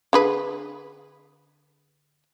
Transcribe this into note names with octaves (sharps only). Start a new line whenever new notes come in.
D3 G#4 B4